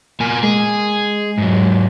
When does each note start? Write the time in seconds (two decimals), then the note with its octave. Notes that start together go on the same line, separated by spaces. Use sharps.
0.20 A#2 A#4 G#5
0.43 G#3 G#4
1.38 G#2 F#3